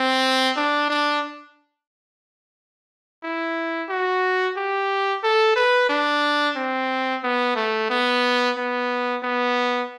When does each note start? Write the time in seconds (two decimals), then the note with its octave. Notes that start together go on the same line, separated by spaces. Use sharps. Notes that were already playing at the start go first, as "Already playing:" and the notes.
Already playing: C4
0.57 D4
0.90 D4
3.24 E4
3.90 F#4
4.57 G4
5.24 A4
5.56 B4
5.89 D4
6.56 C4
7.24 B3
7.56 A3
7.90 B3
8.57 B3
9.23 B3